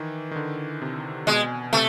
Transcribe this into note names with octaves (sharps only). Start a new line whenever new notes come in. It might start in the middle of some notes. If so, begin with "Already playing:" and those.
Already playing: D#3 E3
D#3
D3
C3
B2 G#3
C3 A3